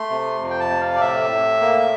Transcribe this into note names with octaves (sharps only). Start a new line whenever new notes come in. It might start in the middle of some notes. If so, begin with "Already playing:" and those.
Already playing: A3 C6
C3
F2
G5
A5
C3
F5
D5
A2 E5
A2
A#3